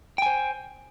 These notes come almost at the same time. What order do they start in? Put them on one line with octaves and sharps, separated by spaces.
G5 G#5 C5